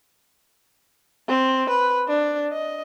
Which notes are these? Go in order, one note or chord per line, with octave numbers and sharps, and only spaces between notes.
C4
B4
D4
D#5